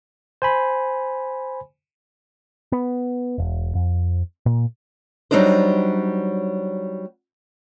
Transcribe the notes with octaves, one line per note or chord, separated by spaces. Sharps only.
C5 G#5 B5
B3
E1
F2
A#2
F#3 G3 C4 D4 D#4 C5